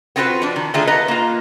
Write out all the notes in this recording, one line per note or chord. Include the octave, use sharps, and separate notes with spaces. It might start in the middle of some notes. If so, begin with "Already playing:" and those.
B3 C4 F4 F#4 B4 C5
F3 D4
D#3
D3 D#3 A3 F4 G#4 A4
B3 B4 D#5 A#5
A#3 F4